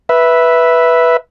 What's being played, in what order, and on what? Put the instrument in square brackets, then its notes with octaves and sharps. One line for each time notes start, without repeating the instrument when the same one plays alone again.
[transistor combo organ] B4 E5